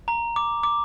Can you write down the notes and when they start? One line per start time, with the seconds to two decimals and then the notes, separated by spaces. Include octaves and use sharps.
0.08 A#5
0.36 D6
0.63 D6